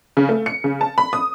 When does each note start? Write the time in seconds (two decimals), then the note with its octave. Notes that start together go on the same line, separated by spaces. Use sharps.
0.17 C#3
0.29 A3
0.46 C#7
0.64 C#3
0.81 A5
0.98 B5
1.13 D#6